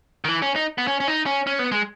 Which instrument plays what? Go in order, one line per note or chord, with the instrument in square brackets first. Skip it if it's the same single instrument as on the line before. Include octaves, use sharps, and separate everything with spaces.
[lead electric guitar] D#3
E3
C#4
D#4
B3
C#4
C#4
D#4
C#4
C#4
B3
G#3